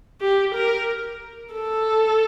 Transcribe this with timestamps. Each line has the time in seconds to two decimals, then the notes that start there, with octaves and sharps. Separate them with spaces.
0.21 G4
0.55 A#4
1.54 A4